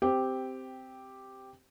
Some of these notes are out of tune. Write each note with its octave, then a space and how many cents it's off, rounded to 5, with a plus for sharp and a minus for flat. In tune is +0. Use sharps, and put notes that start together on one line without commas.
C4 -10 G4 +0